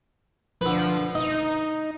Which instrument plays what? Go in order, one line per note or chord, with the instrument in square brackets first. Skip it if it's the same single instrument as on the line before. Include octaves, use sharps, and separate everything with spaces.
[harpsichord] D3 B4 [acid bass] F3
[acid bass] D#4 [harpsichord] D#5